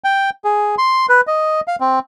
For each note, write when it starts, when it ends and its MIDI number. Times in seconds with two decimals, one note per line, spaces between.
0.04 0.30 79
0.44 0.75 68
0.78 1.06 84
1.09 1.21 71
1.27 1.61 75
1.67 1.76 77
1.80 1.99 60